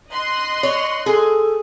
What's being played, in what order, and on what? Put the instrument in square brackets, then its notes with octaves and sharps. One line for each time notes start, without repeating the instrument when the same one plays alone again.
[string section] D#5 C6 F#6
[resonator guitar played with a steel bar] C#5
[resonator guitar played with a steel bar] G#4 [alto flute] A4